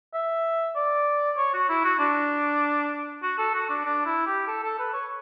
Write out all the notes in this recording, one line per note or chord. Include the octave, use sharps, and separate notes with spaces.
E5
D5
C#5
F#4
E4
F#4
D4
F#4
A4
F#4
D4
D4
E4
G4
A4
A4
B4
C#5